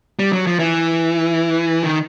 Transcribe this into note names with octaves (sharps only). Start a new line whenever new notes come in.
G3
F#3
F3
E3
D#3